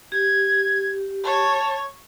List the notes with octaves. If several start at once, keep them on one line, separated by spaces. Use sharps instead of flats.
G4 G#6
C#5 A5